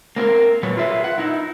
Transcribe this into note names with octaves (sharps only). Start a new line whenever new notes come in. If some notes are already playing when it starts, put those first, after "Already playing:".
A#3 C4 F#4 A#4
A#2 F#3 B4 C#5
F4 G#4 B4 E5
F#5
D#4 E4